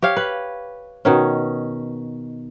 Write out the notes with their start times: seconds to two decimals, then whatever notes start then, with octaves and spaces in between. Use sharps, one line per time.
0.02 G4 C#5 F5
0.16 B4
1.05 B2 D#3 C#4